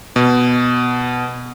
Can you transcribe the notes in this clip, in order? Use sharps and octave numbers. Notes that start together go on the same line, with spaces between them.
B2